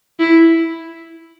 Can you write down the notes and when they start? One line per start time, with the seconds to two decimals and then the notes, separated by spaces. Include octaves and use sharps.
0.20 E4